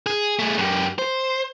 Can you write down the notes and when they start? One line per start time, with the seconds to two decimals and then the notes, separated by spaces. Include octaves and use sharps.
0.06 G#4
0.39 A3 G#4
0.58 F#2 G4
0.99 C5